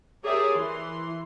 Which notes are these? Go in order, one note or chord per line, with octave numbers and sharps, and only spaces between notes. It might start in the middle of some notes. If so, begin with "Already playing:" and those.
G4 G#4 A#4 C#5 D5 E5
E3 C6